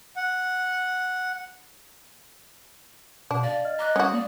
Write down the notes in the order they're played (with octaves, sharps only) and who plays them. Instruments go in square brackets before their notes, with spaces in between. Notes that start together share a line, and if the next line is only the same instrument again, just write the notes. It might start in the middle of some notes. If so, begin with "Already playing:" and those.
[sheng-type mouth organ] F#5
[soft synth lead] B2 [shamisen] D4 [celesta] F#5
[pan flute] D5 [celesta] F5 [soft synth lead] A6
[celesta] D#5 F6
[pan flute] D#5 [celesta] A#5 D6 F#6
[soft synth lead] G3 [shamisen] C#4 F#4 [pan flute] F#5 [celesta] D#6
[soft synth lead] A#3 [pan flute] D5